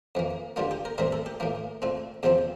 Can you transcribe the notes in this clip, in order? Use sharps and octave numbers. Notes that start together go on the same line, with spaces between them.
F2 E3 A#3
G2 D3 G3 A#3 F4
G4
A#4
A2 E3 G3 C4 A#4
A4
G4
A2 E3 A#3
A#2 A3 C4
E2 C3 F3 C4 G4